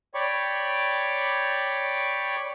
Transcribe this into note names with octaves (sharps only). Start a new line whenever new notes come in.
C#5 D5 G5 B5 C#6 D6